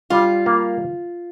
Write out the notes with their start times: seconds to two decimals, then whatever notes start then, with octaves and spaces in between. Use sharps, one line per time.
0.10 G3 F4
0.46 A#3